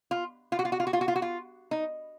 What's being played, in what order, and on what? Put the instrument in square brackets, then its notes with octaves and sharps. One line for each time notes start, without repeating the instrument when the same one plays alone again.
[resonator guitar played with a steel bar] F4
F4
F#4
F4
F#4
F4
F#4
F4
F#4
F4
F#4
F4
D#4